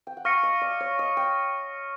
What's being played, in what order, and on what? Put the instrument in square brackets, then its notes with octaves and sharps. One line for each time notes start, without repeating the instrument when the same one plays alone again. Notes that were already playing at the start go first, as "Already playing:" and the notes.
[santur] G5
F#5
[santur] F5 [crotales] C#6 F6 A#6 C#7
[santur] D#5
D5
C#5
D#5
G5